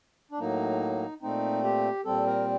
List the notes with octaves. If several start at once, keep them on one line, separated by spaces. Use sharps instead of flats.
D4
A2 F#3 A#3 D#4
A#2 A3 C4 D#4
G4
A#2 G3 C4 A4
A#4